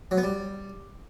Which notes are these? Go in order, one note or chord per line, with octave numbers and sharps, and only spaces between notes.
F#3
B3
G3